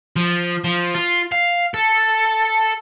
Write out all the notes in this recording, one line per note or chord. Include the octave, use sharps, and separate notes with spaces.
F3
F3
F4
F5
A4